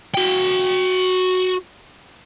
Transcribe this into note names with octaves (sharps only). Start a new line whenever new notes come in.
F#4 G5